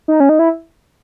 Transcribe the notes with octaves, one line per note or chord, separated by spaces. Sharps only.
D#4
C#4
D#4
E4